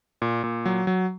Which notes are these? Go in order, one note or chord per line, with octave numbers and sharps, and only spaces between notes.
A#2
A#2
F#3
F#3